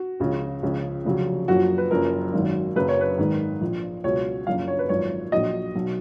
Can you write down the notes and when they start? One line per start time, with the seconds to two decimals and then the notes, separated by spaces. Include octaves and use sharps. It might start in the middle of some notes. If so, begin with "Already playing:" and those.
Already playing: F#4
0.20 C#2 C#3 F3
0.62 C#2 C#3 F3
1.05 F1 F2 C#3 F#3
1.48 F#1 F#2 F3 F#4
1.78 B4
1.91 F#1 F#2 F3 A#4
2.33 G#1 F#2 D#3 F#3
2.76 F#1 F#2 C#3 F#3 B4
2.89 C#5
3.01 B4
3.18 G#1 G#2 D#3
3.61 A#1 A#2 F3
4.04 C#2 B2 F#3 C#5
4.46 F3 F5
4.49 F#1 F#2
4.68 C#5
4.79 B4
4.89 G#1 F#2 F3 C#5
5.32 A#1 A#2 F#3 D#5
5.75 B1 B2 F#3